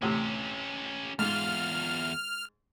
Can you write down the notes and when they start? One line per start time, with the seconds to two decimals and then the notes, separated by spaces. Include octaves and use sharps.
0.02 D2 A2 C3 C#4 G4
1.19 E2 G#2 F4 F6